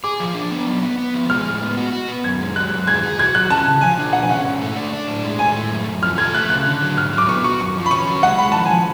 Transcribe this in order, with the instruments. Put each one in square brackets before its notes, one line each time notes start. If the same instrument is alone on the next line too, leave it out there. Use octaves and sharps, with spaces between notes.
[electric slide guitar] G#4 [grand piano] D6
[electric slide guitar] F3
D4
B3
F#3
B3
B3
F3
[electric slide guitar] G#3 [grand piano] F6
[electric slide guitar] A2
B3
F#4
F#4
B3
[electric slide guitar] F#2 [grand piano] G#6
[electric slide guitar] G#3
[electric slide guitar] F#3 [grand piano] F#6
[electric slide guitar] F#2
[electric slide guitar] G#4 [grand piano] G#6
[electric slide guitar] G#4
[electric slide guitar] F#4 [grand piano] G#6
[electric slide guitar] F#3 [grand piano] F#6
[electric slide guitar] C#4 [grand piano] A5
[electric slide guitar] C#3
[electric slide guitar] F3 [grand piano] G#5
[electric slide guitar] D4
[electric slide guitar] B2 [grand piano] F#5
[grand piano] G#5
[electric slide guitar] C#4 [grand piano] F#5
[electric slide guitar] G#2
A3
D4
D4
A2
G#3
[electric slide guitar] A2 [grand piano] G#5
[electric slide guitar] A3
F#2
F#2
[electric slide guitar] F3 [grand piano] F6
[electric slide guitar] A4 [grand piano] G#6
[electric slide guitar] A3 [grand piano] F#6
[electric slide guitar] C#3 [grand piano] F#6
[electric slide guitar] D3
F#3
[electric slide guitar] G#2 [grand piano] F6
[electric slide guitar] F#3
[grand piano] D6
[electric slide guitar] B3 [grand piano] C#6
[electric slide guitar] F#4 [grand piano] C#6
[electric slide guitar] F#2 [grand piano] C#6
[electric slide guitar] F3
[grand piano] B5
[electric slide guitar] C#4 [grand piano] C#6
[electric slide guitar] F#3
[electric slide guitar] G#3 [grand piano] F#5
[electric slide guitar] G#3 [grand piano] B5
[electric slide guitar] F3 [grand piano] A5
[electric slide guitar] F3 [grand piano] G#5